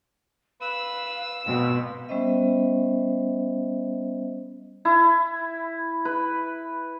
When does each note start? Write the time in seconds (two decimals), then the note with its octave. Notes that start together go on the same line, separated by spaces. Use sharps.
0.61 B4 F5 E6
1.46 B2 C4
2.09 G3 B3 C#4 C5 D#5 E5
4.85 E4
6.05 B4